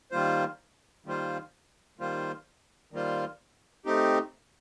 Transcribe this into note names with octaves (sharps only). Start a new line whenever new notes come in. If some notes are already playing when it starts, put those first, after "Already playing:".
D#3 G3 A#3 F4 C5
D#3 G3 A#3 F4 C5
D#3 G3 A#3 F4 C5
D#3 G3 A#3 F4 C5
A3 C4 D#4 G4